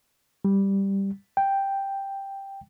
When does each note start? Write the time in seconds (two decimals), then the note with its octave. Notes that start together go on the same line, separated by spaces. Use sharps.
0.45 G3
1.37 G5